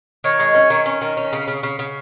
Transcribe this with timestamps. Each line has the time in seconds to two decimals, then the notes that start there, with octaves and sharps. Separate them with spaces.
0.24 D#3 C#5
0.40 G#3
0.55 C#4
0.70 D#3
0.86 C#4
1.02 D#3
1.17 C#4
1.33 C#3
1.48 C#3
1.63 C#3
1.79 C#3